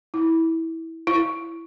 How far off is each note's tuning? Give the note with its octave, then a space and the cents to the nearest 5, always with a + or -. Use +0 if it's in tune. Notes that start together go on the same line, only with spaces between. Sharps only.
E4 -15
E4 +10